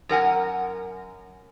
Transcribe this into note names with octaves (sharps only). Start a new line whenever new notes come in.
F#2 A#4 F#5 G#5